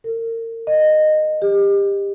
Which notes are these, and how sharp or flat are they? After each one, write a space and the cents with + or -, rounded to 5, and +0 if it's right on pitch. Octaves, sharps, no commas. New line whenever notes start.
A#4 -35
D#5 -15
G4 +25